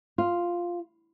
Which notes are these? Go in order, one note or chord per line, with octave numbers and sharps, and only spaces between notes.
F4